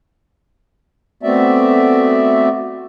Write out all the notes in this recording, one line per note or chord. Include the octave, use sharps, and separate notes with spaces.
A3 B3 C4 F#4 D5 E5